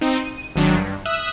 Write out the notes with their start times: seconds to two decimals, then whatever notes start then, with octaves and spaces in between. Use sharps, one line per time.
0.01 C4 D#4
0.20 D#7
0.56 G#1 D#3 F#3 D4
0.76 G2
1.05 E5 D#6 E6 F#6 E7